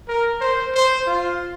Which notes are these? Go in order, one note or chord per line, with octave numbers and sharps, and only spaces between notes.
A#4
C5
C5
F4